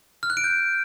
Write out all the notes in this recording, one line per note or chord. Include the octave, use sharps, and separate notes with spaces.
F6
F#6
D7
G6